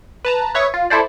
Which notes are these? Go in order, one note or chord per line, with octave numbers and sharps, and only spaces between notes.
B4 A5 A#5
B4 C#5 E5 C#6 D#6
F4
E4 A4 C5 D5